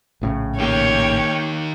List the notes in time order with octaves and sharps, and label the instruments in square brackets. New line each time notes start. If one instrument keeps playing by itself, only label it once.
[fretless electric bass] A#1 A2 C#3
[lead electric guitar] D#3 G4 [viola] A#3 G5 [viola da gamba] C#5